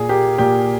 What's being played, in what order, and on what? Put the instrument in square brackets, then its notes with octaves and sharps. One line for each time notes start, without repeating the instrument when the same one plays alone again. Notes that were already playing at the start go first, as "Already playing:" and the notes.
Already playing: [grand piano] A#2 G#4
A#3 G4
A#2 G4